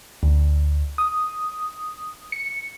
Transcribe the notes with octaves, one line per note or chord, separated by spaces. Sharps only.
D2
D#6
C#7